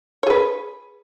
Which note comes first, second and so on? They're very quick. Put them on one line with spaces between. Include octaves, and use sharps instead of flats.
C#5 G#4 B4